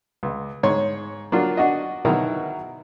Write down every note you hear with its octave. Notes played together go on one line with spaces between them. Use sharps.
C#2
G#2 C#5 C6
F#3 A#3 D4 F4
D4 F#4 D#5
B2 D#3 F#3 E4 F#4 A#4